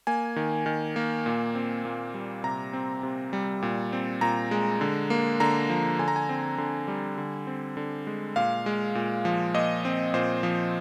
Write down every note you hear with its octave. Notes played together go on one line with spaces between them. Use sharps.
A#3 G#5
D#3
D#3
A#3
A#2
C4
A#2
G3
C3 A#5
C4
C3
G3
A#2
C4
A#2 A#5
G#3
D3
A#3
D3 A#5
F3
D3 G#5
A#5
G#5
C4
D3
G3
D3
C4
D3
G#3
A#2 F5
G#3
A#2
F3
A#2 D#5
C4
A#2 C5
F3